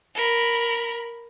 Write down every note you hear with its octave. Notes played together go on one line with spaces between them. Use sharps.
A#4 B5